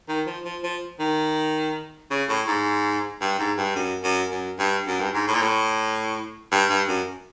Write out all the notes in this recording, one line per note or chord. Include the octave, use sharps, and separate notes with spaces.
D#3
F3
F3
F3
D#3
C#3
A2
G#2
G2
G#2
G2
F#2
F#2
F#2
G2
F#2
G2
G#2
A2
A#2
A2
G2
G2
F#2